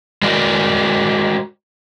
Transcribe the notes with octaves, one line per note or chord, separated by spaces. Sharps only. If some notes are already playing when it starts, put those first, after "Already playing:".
G#3 F#4 A#4 D5